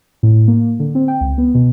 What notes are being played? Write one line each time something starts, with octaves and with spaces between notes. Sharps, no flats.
A2
A#3
D3
C4
G5
C#2
B3
B2